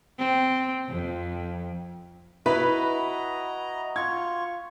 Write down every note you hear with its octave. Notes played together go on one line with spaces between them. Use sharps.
C4
F2
E4 F#4 B4 D#5 A#5
F4 C#6 G#6